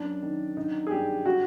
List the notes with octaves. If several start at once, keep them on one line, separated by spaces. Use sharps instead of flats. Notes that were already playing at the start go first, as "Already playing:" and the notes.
Already playing: F#2 D4
D#3
D3 D#4
G#4
G2 G4
D3 F#4